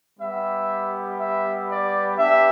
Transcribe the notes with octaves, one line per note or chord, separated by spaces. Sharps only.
G3 B3 G4 E5
E5
D5
B3 D4 G4 E5